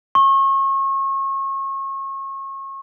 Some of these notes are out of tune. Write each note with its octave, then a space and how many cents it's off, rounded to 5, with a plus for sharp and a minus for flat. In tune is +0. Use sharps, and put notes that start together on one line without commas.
C#6 -35